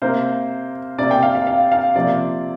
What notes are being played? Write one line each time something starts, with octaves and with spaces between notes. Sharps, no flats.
C3 A#3 C5
C3 A#3 D5
G5
F5
F5
F5
F5
C3 F3 A#3 D5